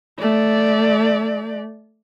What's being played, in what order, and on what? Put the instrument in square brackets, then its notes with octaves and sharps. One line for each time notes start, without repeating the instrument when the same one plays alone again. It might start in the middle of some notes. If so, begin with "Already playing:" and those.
[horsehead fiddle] A3 D5